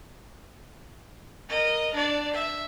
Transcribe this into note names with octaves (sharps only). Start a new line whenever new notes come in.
A#4 D#5
D4 D5
E5